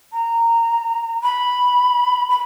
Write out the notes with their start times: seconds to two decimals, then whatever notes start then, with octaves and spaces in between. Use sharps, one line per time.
0.13 A#5
1.23 B5
2.30 B5